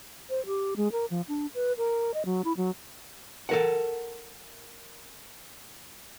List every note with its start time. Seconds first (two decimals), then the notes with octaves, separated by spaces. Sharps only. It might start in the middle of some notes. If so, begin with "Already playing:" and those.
0.30 C5
0.46 G4
0.76 G#3
0.92 A#4
1.10 F3
1.28 D4
1.54 B4
1.78 A#4
2.14 D#5
2.26 F#3
2.44 E4
2.57 F#3
3.49 A4 A#4 F#5